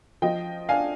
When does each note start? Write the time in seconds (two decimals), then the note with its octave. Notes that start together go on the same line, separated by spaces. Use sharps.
0.22 F3 D#5 G5
0.69 D4 F5 G#5